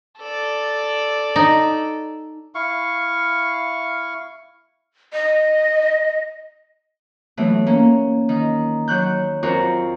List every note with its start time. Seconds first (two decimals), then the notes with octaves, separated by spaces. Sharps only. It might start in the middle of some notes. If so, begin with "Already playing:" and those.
0.19 A4 D5
1.36 D#4
2.55 E4 F5 C#6
5.13 D#5
7.37 E3 F#3 A3 B3
7.66 A#3 C#4
8.29 D#3
8.88 F#3 C#6 F#6 G6
9.43 F2 F4 F#4 A#4 C#6